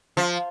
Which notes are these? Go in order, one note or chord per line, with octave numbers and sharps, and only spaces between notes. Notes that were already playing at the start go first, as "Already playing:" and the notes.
F3